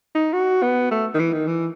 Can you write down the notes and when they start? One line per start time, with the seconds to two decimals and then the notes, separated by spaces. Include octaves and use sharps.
0.15 D#4
0.33 F#4
0.62 B3
0.91 A3
1.14 D#3
1.19 E3
1.33 D#3
1.47 E3